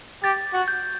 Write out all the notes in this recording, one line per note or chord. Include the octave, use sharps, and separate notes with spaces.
G4 A6
F#4
G6